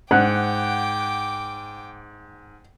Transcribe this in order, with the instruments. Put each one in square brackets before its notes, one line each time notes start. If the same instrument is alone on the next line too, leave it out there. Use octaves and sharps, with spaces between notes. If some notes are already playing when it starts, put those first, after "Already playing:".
[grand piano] G#2 [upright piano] F#5 F#6 [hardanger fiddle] G5 D6